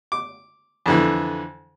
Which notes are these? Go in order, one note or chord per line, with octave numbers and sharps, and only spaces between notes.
D6
F2 D3 E3